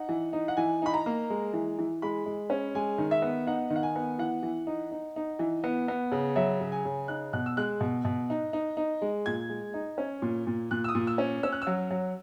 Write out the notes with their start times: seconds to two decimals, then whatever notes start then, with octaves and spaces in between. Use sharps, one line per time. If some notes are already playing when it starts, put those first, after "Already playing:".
Already playing: D#4 F#5
0.09 E3
0.33 D#4
0.48 F#5
0.57 E3 G#5
0.82 D#4 B5
0.94 A#5
1.06 A#3
1.30 G#3
1.53 E3
1.78 E3
2.02 G#3 B5
2.26 G#3
2.50 C#4
2.75 G#3 G#5
2.98 D#3
3.11 E5
3.22 B3
3.47 D#4 F#5
3.70 D#3
3.76 F#5
3.83 G#5
3.96 B3
4.19 E3 F#5
4.43 E3
4.67 D#4
4.91 D#4
5.16 D#4
5.39 E3
5.64 B3
5.88 B3
6.12 C#3
6.36 F#3 E5
6.61 C#3
6.72 G#5
6.85 C#3
7.08 D#4 F#6
7.33 B2 F#6
7.46 E6
7.57 G#3 F#6
7.80 B2
8.05 B2
8.30 D#4
8.53 D#4
8.77 D#4
9.02 G#3
9.26 A#2 G#6
9.49 G#3
9.74 D#4
9.98 C#4
10.22 A#2
10.47 A#2
10.71 A#2 F#6
10.84 E6
10.89 D#6
10.95 A#2
11.07 E6
11.18 C#4
11.43 C#4 E6
11.52 F#6
11.62 E6
11.67 F#3
11.91 F#3